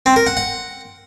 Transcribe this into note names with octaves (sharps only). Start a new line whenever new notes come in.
C4
A#4
F#5
F#5